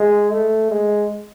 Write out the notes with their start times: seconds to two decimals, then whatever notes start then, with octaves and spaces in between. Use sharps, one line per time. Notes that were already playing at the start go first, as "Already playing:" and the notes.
Already playing: G#3
0.32 A3
0.71 G#3